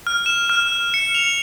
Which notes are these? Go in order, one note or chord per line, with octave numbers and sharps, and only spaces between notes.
F6
E7
F6
C#7
F7